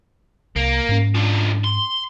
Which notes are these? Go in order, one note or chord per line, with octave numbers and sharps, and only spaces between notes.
C2 A#3
G#2 C#4
D3 F3
C6